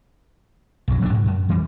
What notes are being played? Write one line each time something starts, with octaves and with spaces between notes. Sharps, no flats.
B1 F#2 F#3
D#1 F#3 G#3 D4
G#2
F#2
F2 E3 G3